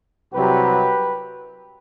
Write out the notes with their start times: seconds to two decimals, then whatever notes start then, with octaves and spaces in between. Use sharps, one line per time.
0.32 C2 C3 F#3 G4 B4